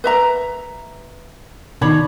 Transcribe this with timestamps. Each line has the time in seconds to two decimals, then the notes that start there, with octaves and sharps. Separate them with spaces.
0.04 B4 E5 A#5
1.81 B2 D#3 D4 D#4 C#5 B5